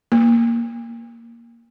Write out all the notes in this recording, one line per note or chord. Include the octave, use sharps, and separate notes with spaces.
A#3